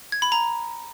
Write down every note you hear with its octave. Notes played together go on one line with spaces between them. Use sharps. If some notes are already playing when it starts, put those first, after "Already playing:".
G#6
B5
A#5